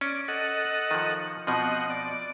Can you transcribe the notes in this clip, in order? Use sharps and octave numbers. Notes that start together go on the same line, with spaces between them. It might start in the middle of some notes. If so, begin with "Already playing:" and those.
C#4 D5
A4 D#5 F#5
D#3 F3
B2 F3 C4 D#5 F#5
D5